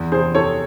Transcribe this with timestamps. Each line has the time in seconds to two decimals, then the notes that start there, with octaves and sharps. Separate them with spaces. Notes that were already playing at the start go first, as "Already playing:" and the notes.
Already playing: E2
0.12 C3 G#4 C5
0.35 C3 A4 C#5